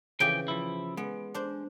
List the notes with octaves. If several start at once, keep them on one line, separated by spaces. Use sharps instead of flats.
C#3 E3 F3 G4 G5 G#5
F3 E4
G#3 B3
D4 C5